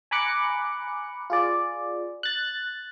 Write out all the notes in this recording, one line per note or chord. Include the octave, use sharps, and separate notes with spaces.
G#5 A#5 B5 D6 F#6 C#7
F4 G#4 D5
F#6 A6